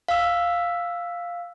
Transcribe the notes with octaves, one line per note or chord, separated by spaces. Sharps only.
F5 E6